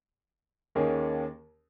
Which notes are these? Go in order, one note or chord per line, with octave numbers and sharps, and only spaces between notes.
D#2 D#3 A#3 C#4 G#4